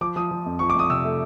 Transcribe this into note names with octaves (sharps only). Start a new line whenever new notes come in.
F3 D6
F3 D#6
F3
F2
F3 C#6
D6
F2 D#6
C3 E6
A3